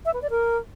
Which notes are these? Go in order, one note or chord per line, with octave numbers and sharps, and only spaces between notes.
E5
B4
D5
A#4